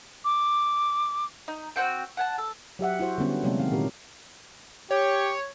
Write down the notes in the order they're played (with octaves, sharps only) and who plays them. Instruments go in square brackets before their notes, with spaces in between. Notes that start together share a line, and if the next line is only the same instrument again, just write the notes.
[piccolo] D6
[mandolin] D#4
C4 F#4 G5
F#5 G#5 A5
A4
[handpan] F#3 G4 E5 F#5
E4 F#4 C5
D3 G3 B3 C#4
C3 F#3 G#3 A#3 C4 D4
D#3 F5
A#2 D#3 G4 A#4
[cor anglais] G4 [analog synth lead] C#5